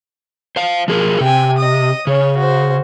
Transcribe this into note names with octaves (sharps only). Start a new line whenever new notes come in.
C5 F5
F3 G#4 A#4
C3 G5 G#5
D#5 D#6
C#3 C#5
F#4 C5